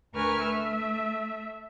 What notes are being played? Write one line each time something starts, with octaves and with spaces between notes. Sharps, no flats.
D2 A#4 B4 G#5 C#6 F6
A3 E5